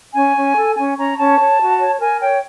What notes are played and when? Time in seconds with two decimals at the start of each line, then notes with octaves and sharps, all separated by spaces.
0.15 C#4 G#5
0.35 C#4
0.56 A4
0.76 C#4 G#5
0.97 C#4 A#5
1.17 C#4 A5
1.38 C#5
1.59 F#4
1.79 C#5
2.00 A#4 G#5
2.21 C#5 G5